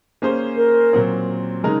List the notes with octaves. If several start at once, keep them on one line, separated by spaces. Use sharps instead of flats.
A#3 C#4 G#4 C5
A#4
A#2 F#3 C4
C#3 G#3 D#4 A#4